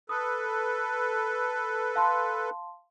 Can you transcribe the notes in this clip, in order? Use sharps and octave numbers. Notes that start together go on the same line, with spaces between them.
A4 B4 D#6
F5 A5 C6